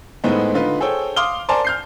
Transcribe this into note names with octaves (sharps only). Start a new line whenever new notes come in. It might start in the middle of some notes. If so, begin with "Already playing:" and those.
A2 G#3 B3 C4 D#4
D3 D#4 F4 B4
G#4 A4 C5 C#5 G5
F5 C6 D6 D#6 F6 G7
A#4 C5 D5 G#5 A5 C6
F6 G6 C7